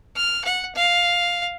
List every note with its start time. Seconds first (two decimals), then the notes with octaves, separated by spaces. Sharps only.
0.16 F6
0.45 F#5
0.75 F5